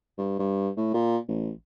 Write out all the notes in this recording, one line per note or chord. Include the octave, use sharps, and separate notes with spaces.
G2
G2
A2
A#2
A1